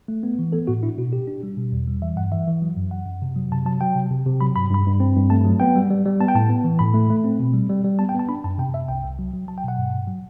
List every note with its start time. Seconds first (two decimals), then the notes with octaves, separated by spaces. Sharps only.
0.08 A3
0.23 B3
0.39 E3
0.52 B3 A4
0.67 A2 F#4
0.83 D4 E4
0.98 B2 F#4
1.12 D4 G4
1.27 D4
1.43 G3
1.57 B2
1.72 E2
1.88 G3
2.02 E3 E5
2.17 G2 F#5
2.32 E3 E5
2.47 E3
2.62 F#3
2.77 F#2
2.91 F#2 F#5
3.06 F#2
3.22 C3
3.36 F#3
3.52 C3 A5
3.66 F#3 A5
3.81 F#3 G5
3.96 C3
4.11 C3
4.26 C3
4.41 F#3 B5
4.55 G2 B5
4.70 G2 B5
4.86 G2
5.00 C4
5.16 G2
5.30 A3 A5
5.45 F#3
5.60 B3 G5
5.75 G3
5.90 G3
6.06 G3
6.21 B3 A5
6.28 G5
6.35 A2 A5
6.49 B3
6.64 E3
6.79 A2 B5
6.94 A3
7.10 A3
7.24 C4
7.40 B2
7.54 G3
7.69 G3
7.84 G3
7.99 B3 A5
8.09 G5
8.14 B3 A5
8.29 D4 B5
8.44 F#2 A5
8.58 C3 G5
8.73 C3 E5
8.88 C2 G5
9.04 C2
9.19 F#3
9.34 F#3
9.48 F#3 A5
9.58 G5
9.64 B2 F#5
9.77 G2
9.93 G2
10.07 F#3